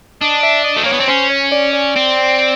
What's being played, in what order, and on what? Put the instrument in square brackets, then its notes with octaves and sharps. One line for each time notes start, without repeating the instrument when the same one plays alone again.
[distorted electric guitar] D4 [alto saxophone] D#5
[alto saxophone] E5
D#5
[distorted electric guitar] A3
[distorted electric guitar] A#3 [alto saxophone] C#5
[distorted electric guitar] B3
C4
[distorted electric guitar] C#4 [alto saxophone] C5
[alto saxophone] C#5
D5
D5
[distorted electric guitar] C4